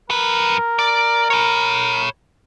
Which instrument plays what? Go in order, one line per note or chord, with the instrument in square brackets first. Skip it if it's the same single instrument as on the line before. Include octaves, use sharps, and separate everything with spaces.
[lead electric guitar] F#2 B4 [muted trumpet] A#4
[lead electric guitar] D5
C#5 B5